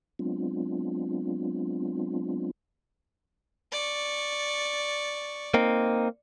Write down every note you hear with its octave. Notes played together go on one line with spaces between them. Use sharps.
F#3 G#3 B3 C4 D4 F4
D5 C#6
A#3 C4 D#4